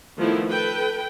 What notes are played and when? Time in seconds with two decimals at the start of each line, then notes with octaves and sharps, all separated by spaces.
0.18 D#3 F3 A3 B3 E4
0.51 A4 B4 G5